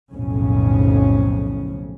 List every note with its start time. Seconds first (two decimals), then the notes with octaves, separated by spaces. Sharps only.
0.13 B1 F2 A2 C#3 C#4